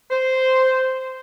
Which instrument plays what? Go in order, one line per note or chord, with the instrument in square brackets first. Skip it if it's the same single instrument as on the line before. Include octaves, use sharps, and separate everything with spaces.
[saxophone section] C5